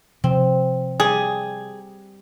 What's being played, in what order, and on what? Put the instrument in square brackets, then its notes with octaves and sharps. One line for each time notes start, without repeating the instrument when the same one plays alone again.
[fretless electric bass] C3 F3 [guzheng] C4
[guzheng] G3 [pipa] G#4